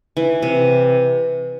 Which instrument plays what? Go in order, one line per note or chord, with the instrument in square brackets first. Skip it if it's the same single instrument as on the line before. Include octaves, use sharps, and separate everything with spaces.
[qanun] E3
C3